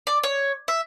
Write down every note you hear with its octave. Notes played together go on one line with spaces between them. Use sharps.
D5
C#5
E5